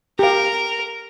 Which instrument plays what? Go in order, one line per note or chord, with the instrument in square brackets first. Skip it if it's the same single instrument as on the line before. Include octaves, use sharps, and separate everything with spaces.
[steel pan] G4 F5 [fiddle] A#4